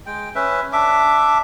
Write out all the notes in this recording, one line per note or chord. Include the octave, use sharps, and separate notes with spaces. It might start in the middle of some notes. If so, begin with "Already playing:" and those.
G#3 G5
C#4 B4 E5
D4 E5 D6